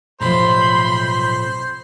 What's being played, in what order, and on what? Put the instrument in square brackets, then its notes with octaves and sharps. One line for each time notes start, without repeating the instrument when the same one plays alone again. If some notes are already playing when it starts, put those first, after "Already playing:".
[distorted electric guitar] B1 [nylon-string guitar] A2 C3 F3 [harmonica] C5 [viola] B5 C6